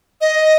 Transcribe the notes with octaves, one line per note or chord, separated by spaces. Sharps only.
D#5